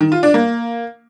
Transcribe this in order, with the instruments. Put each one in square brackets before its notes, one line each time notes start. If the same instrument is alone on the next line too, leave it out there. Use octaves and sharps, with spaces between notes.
[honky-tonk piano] D#3
F4
D4
A#3